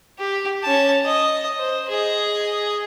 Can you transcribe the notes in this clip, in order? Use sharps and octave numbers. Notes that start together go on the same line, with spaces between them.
G4
C#4 A5
D#5
C5
G#4 D#5